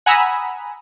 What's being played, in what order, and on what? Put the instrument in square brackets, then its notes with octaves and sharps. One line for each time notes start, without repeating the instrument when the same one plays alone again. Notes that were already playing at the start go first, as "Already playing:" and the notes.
[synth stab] F#5 G#5 A#5 B5 D#6 E6